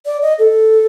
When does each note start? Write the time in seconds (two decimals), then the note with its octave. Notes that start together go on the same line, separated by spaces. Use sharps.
0.06 D5
0.22 D#5
0.39 A4